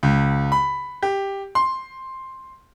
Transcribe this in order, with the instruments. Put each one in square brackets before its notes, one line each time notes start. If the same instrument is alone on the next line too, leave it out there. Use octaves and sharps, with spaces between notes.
[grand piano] C#2
B5
G4
C6